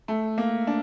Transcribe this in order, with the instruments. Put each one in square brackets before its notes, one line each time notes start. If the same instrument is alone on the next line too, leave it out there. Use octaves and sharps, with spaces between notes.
[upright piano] A3
A#3
D4